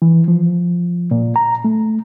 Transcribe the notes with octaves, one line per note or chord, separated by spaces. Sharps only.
E3
F3
A#2
A#5
A3